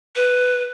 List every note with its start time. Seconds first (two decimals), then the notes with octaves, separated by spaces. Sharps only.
0.16 B4